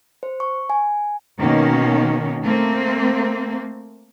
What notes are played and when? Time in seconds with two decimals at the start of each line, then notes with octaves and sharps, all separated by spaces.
0.23 C5
0.40 C#6
0.70 G#5
1.40 B2 D#3 A#3 C#4
2.45 A3 A#3 C4